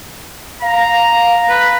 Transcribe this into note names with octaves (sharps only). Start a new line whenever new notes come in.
F5 A#5
B4